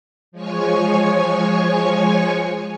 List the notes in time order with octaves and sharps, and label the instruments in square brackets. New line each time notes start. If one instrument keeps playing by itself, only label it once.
[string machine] F3 G#3 C#5 G#5 C#6